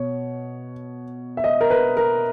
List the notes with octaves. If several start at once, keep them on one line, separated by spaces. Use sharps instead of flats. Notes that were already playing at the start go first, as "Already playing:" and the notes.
Already playing: B2 C#5
E5
D#5
A#4
B4
A#4